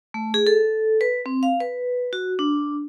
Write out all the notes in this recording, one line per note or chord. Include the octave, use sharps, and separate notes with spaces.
A3
G#4
A4
B4
C4
F5
B4
F#4
D4